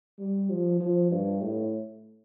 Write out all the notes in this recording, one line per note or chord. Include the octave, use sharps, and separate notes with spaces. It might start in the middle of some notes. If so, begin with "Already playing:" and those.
G3
F3
F3
G2
A2